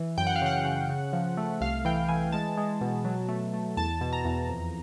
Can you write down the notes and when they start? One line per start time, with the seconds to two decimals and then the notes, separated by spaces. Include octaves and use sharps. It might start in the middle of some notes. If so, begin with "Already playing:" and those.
Already playing: E3
0.18 F#2 G5
0.27 F#5
0.36 F5
0.42 C#3 F#5
0.65 C#3
0.89 C#3
1.13 F3
1.37 A3
1.61 C2 F5
1.85 E3 G5
2.08 E3 G#5
2.32 G#3 A5
2.57 G#3
2.81 B2
3.05 F#3
3.29 A3
3.53 A3
3.77 E2 A5
4.01 B2
4.13 A#5
4.25 E2
4.49 F2